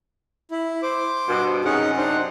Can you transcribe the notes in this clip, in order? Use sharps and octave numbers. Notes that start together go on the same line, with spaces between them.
E4
C5 D6
G2 B2
F#2 C3 C#4 D#4 G#4 F#5
D4 D#4 C5